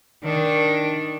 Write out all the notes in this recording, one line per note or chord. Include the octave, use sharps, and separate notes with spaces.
D#3 D4